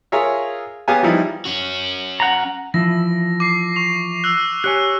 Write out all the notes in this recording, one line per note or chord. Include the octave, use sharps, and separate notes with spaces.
F4 G#4 A#4 C#5 E5
B3 C#4 G4 G#4 F5 G#5
F3 G3 D#4 E4
C#4 F#4
F#5 A#5
E3 F3 E4 A#6
D6 C7
C#6 F7
E6 F#6
G4 C#5 G#5 F#6